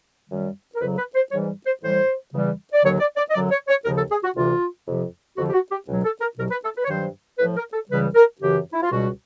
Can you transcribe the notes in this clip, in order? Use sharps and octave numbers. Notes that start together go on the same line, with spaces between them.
F#2 D#3 G3
A#4
F2 C#3 F#3 B4
B4
C5
G#2 E3 G3 C#5
C5
A2 E3 G3 C5
E2 C#3 E3 G3
D5
D#2 D3 F#3 C#5
D5
D5
D#5
F#2 D3 F#3 D5
C#5
C#5
D#2 C#3 F3 A#4
A4
G#4
F#4
D2 C3 E3 F4
F2 C3 F3
F2 D3 F3 F#4
G4
F#4
G4
C#2 B2 F#3
A4
A#4
C2 B2 F#3 A#4
B4
A4
B4
C#5
G2 D#3 F#3 C5
A2 F3 B4
A#4
A4
C#2 C#3 E3 G3 B4
A#4
F#2 C#3 E3 G4
E4
F4
C#2 B2 G3 F#4